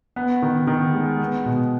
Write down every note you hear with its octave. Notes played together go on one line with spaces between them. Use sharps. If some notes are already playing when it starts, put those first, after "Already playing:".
B3
D#3
D#3
G#3
B3
B2